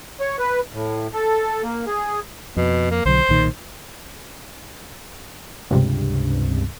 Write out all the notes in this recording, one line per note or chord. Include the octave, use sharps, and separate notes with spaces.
C#5
B4
A2
A4
A#3
G#4
F2 B2
A#3
B1 D3 F#3 C5
B1 A#2 D#3
C#2 G2 C3